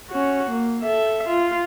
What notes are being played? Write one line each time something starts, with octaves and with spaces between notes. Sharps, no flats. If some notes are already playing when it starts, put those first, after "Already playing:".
C#4 F#4
A#3
A4 E5
F4